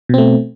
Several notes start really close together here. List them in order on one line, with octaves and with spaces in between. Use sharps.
B2 C4 A3